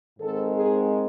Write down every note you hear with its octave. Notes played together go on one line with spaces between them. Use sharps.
G#2 D#3 G#3 C4 A4
G#4